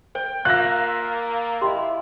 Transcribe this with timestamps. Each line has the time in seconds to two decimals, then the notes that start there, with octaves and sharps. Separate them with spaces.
0.15 C5 G5
0.45 A#3 F4 E5 F#6 A#6
1.61 E4 G4 D#5 C6